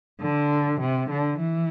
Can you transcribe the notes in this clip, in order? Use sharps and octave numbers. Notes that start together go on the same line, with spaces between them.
D3
C3
D3
E3